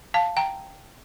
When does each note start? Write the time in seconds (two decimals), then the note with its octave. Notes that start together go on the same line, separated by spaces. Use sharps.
0.14 F5 A5
0.37 G5 A#5